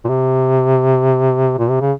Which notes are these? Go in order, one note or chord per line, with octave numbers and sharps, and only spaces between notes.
A#2
C3
A#2
C3
C#3